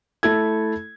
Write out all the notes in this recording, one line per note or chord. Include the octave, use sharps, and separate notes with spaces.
A3 E4 A4 G#6